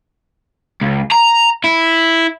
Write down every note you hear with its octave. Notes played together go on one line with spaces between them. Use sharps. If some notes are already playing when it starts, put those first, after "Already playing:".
C#2
A#5
E4